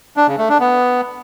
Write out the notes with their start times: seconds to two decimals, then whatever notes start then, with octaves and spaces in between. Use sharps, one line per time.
0.17 D4
0.28 C#3
0.38 A3
0.49 D4
0.60 B3